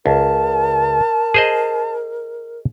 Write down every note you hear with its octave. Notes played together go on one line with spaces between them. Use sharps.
C#2 A#4 A5
G#4 C5 D#5